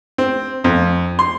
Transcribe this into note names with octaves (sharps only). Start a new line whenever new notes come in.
C4
F2
C6